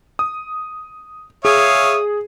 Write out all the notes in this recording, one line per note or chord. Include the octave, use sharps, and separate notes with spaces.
D#6
G#4 C#5 E5 F5 D#6